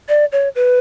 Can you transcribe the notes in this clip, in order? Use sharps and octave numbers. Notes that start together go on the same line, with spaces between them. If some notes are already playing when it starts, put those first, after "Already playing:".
D5
C#5
B4